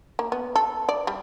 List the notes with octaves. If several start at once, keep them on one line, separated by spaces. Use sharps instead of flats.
A#3
B3
A4
D5
G3